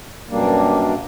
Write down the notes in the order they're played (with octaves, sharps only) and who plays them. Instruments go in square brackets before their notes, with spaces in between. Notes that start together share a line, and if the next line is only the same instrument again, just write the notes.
[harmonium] F#2 B2 G3 A#3 D4